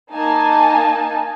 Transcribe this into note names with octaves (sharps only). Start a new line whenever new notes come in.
A#3 D#4 G#5 A5